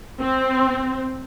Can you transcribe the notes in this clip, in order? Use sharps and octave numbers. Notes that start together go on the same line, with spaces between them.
C4